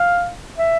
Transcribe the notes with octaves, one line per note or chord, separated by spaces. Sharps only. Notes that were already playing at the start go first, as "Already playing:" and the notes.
Already playing: F5
E5